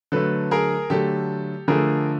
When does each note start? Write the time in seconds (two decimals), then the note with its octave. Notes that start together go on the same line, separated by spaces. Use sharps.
0.12 D3 F#3 A3 A4 B4
0.51 G#4 A#4
0.90 D3 F#3 A3 G4 A4
1.68 D3 F3 A3 G#4 A#4